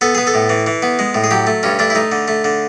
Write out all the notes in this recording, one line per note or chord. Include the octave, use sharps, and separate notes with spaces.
B3 A4
B3 G#4
A4
A2
E3
E3
B3
G#3
A2
G#4
F#3 G4
A3
G2 C#4
A3 D4
E4
A3 D#4
D3
A3
D3